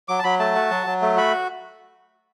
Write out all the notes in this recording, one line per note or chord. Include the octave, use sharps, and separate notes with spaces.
F#3 D6
A5
F#3 B5
A3 A5
F#4
F#3
F#3
A3
F#4 B5